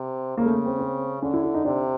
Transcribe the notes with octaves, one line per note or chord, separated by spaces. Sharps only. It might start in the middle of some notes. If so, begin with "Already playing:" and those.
Already playing: C3
C#3 A#3
A3
A#3
C4
C4
D3 C#4
E4
E4
D#4
C3 D4